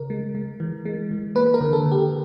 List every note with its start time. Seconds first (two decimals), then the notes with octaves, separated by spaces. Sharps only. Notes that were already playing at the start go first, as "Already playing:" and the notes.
Already playing: C#3 A#4
0.10 G#3
0.35 G#3
0.60 E3
0.85 G#3
1.11 E3
1.35 A#3 B4
1.54 A#4
1.61 D3
1.73 A4
1.86 D3
1.92 G4